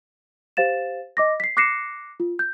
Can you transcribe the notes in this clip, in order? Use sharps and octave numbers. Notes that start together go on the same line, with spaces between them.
G4 C5 F5 A6 E7
D#5 D6 A#6
B6 C7
D6 F#6 A#6 C7 C#7 E7
F4
G6